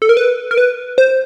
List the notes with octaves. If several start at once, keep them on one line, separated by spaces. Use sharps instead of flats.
A4
A#4
B4
A#4
B4
C5